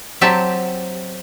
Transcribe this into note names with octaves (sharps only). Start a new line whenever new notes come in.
F#3 C4 G4 E5 A5